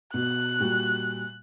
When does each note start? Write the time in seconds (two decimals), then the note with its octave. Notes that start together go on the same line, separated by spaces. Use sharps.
0.14 B2 F#6
0.60 A#2 G3 F#4